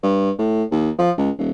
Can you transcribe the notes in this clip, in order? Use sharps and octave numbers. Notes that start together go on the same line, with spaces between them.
G2
A2
D#2
F3
C#2
D#1